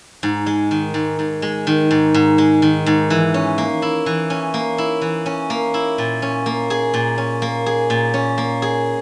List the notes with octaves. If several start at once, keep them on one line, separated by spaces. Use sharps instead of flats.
G#2
G#3
D#3
G#2
G#2
G#3
D#3
G#2
G#2
G#3
D#3
G#2
E3
C#4
A#3
E4
E3
C#4
A#3
E4
E3
C#4
A#3
E4
A#2
C#4
A#3
G#4
A#2
C#4
A#3
G#4
A#2
C#4
A#3
G#4